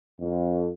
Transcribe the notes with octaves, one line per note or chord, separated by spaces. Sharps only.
F2